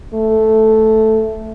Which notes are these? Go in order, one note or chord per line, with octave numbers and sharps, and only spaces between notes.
A3